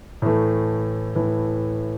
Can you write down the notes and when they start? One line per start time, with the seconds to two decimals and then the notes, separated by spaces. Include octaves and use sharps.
0.22 A2 E3 A3
1.16 A2 E3 A3